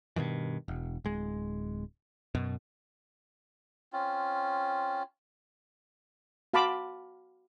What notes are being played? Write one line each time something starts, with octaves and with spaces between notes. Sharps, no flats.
G2 B2 D#3 E3
E1
D1 G#3
F#2 B2
C4 C#4 F4
F#4 F5 A5 B5 C6 D6